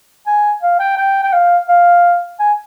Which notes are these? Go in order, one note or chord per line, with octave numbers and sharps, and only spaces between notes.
G#5
F5
G5
G5
G5
F5
F5
G#5